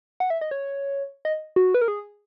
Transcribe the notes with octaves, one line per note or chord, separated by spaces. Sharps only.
F#5
E5
D#5
C#5
D#5
F#4
B4
A#4
G#4